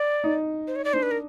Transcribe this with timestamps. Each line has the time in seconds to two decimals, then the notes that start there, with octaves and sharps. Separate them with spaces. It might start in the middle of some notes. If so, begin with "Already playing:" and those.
Already playing: D5
0.24 D#4
0.67 C5
0.76 C#5
0.85 D5
0.93 D4 C5
1.03 B4
1.11 A#4